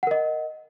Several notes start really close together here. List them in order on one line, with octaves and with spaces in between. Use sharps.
F#5 A#4 D#5